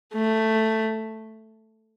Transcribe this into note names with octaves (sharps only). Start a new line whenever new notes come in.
A3